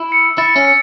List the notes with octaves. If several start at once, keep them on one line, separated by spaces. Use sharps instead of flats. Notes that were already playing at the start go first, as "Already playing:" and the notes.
Already playing: E4 E6
C#7
E4 A6
C#4
C#7